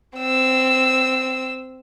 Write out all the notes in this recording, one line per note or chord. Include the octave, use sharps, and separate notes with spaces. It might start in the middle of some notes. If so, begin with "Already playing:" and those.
C4 E6